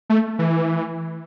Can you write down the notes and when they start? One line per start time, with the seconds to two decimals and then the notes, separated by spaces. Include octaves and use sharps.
0.10 A3
0.39 E3